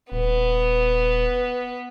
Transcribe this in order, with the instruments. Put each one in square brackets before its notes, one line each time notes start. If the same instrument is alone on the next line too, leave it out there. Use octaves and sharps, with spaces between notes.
[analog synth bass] D#1 [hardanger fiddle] B3